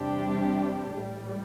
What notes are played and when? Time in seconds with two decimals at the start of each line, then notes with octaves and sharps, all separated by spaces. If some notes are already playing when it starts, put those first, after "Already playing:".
Already playing: E2 C3 G3 D4 G4
0.96 A1 A2 G3